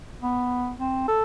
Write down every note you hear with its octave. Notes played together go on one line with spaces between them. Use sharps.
B3
C4
A4